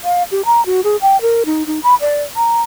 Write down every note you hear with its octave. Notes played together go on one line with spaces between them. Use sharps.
F5
G4
A#5
F#4
G#4
G5
A#4
D#4
D#4
B5
D5
A#5